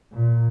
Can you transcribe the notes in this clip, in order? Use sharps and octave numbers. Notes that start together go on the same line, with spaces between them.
A#2